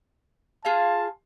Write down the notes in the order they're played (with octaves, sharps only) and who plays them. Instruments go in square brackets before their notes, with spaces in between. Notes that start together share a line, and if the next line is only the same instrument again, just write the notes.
[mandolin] F4 G#4 F5 [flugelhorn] A5